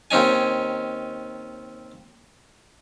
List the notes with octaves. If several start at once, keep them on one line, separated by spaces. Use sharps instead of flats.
D#2 C4 C#4 D#4 G#5